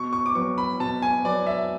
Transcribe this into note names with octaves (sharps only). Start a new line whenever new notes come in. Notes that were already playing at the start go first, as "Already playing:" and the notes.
Already playing: B2 C#6
C#6
D6
F#3 B3 C#6
B5
B2 A5
G#5
F#3 B3 D5
E5